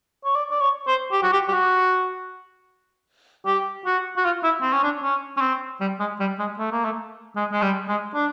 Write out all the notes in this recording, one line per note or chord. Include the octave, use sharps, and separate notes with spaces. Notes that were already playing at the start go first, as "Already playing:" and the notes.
C#5
D5
D5
C#5
C5
G4
F#4
G4
G4
F#4
G4
F#4
F#4
F4
E4
C4
C#4
D4
C#4
C#4
C4
G3
G#3
G3
G#3
A3
A#3
A3
G#3
G#3
G3
G#3
D4